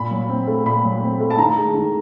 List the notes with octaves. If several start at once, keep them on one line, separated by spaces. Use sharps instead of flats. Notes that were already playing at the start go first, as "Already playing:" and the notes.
Already playing: A#2 B5
F#3
C4
A3
A#2 B5
F#3
C4
A3
A5
D#3 A#5
G#3
D#3